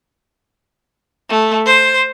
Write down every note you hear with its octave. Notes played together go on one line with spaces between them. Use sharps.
A3
C5